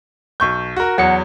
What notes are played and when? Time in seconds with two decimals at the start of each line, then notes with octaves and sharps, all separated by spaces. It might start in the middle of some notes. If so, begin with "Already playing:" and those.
0.40 B1 C#6 G6
0.76 F#4 A#4
0.98 E2 F#3 F#5 C#7